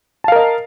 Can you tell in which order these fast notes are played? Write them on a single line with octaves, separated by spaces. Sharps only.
A5 F5 A#4 D#5